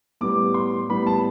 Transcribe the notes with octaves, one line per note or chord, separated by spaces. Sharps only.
A2 G3 B3 D6
C6
A2 G3 B3 B5
A5